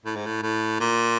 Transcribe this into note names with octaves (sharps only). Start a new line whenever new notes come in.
A2
G#2
A2
A2
A#2